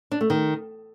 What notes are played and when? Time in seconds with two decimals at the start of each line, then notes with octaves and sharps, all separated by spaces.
0.11 D4
0.21 A3
0.30 D#3